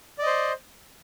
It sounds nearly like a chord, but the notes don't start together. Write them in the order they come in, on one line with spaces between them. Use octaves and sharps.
D5 D#5 C5